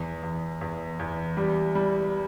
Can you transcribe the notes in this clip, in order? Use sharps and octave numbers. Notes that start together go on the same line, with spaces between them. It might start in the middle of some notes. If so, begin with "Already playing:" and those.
Already playing: E2
E2
E2
E2
G3
G3